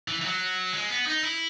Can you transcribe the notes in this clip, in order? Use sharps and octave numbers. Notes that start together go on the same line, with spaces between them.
E3
E3
F#3
G#3
B3
D#4
E4